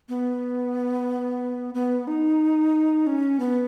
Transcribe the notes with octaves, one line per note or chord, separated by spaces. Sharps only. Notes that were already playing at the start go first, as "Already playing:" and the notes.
B3
B3
D#4
C#4
B3